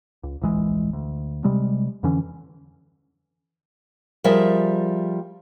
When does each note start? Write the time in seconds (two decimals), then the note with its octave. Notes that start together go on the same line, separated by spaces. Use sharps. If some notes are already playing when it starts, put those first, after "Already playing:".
0.23 C#2
0.42 D1 A#1 E3 G#3
0.93 D2
1.44 C3 G3 G#3
2.03 F2 D3 E3 C#4
4.24 F3 G3 G#4 A#4 E5